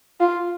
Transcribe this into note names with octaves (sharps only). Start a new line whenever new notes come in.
F4